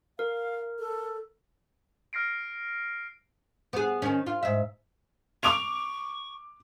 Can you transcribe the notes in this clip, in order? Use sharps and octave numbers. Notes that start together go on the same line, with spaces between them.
A#4 F5
A4
F6 A#6 C7 D7
B3 G#4
D#3 C#4
F4
G#2 E5
C#6 D6 D7 F7